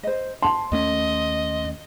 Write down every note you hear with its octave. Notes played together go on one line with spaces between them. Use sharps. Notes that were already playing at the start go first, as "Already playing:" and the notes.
C5 D#5
A5 C6
D#2 A3 C#4 D#5